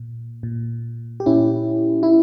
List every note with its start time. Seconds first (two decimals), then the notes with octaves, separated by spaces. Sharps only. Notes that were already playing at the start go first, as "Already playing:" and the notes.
Already playing: A#2
0.43 A#2
1.20 G4
1.26 A#2 C#4 E4
2.03 E4